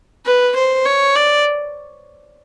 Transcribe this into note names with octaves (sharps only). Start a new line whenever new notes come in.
B4
C5
C#5
D5